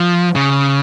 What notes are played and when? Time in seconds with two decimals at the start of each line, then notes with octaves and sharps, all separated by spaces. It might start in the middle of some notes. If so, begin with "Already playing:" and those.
Already playing: F3
0.35 C#3